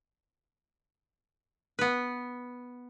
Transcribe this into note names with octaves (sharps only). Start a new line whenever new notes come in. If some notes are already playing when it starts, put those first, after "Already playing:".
B3 B4